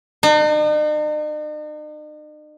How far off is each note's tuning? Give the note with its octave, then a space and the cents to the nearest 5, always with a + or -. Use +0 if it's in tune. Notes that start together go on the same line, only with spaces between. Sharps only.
D#4 -45